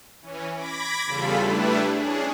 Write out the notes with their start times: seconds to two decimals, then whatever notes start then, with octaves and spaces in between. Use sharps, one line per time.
0.22 E3 C#4
0.55 B5 D6 G#6 A#6 B6 D7
1.05 E2 C#3 G3 F4 A4 B5
1.37 G3 A3 D4 E4 B4
1.93 C#4 D4 G#4